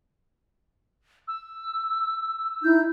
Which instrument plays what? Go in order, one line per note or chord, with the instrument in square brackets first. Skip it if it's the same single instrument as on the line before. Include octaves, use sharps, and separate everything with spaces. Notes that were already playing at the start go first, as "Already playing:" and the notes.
[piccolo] E6
[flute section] D#4 E4 G6